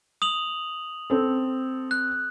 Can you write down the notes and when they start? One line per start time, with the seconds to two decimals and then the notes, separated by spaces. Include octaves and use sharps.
0.22 D#6 F7 F#7
1.10 C4 A4
1.91 F#6